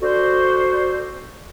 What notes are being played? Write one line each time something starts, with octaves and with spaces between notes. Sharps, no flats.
D4 F#4 A4 C5